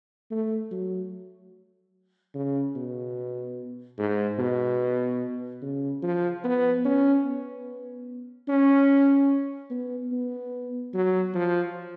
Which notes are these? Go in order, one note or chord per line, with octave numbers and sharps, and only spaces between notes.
A3
F#3
C#3
B2
G#2
B2
C#3
F3
B3
C#4
B3
C#4
B3
B3
F#3
F3